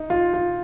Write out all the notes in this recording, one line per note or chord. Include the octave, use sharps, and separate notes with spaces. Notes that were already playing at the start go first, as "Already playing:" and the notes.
Already playing: D#4
F4
F4